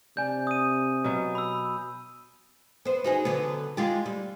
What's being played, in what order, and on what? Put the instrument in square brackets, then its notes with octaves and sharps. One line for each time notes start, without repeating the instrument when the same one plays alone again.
[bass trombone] C3 [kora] D4 [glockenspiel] G#5 G6
[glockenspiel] D#6 D#7
[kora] B2 F#3 B3
[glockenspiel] B5 E6
[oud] B3 C5
D#4 F#4 G#4
D3 F#3 B3
G#3 F4 G4
G3